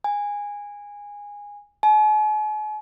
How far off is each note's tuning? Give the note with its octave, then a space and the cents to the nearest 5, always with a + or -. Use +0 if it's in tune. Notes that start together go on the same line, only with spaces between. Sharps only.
G#5 -15
G#5 +45